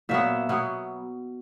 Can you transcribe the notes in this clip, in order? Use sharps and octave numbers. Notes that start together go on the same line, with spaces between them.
A#2 F#3 B3 E5
B2 F#3 B3